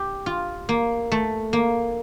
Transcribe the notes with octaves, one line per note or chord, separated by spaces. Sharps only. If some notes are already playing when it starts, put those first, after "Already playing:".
Already playing: G4
F4
A#3
A3
A#3